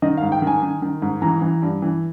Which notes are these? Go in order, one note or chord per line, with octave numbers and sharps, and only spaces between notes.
D#3 D#5
F5
G#2
G5
D#3
G#5
D#3
D#3
G#2
E3 A#5
E3
G2
E3